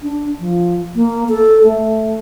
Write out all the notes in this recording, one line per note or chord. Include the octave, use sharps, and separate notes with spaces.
D4
F3
A#3
A4
A3